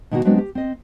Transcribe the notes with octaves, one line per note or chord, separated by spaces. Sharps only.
B2 D#3 A#3 D#4 F4 F#4
F#3 G#3 B3 C4 D4 F#4
G4
C4 D#5